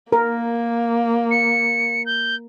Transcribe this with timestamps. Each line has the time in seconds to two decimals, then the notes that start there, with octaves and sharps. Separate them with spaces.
0.12 A#3 A#4
1.31 C#7
2.06 G6